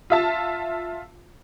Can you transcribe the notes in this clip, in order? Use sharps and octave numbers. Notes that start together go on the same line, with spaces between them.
F4 E5 A5